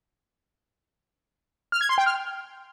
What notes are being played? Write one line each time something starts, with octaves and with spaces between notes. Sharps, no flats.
F6
G#6
C6
G5
F6